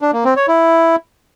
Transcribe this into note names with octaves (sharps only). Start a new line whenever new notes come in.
D4
A#3
C4
C#5
E4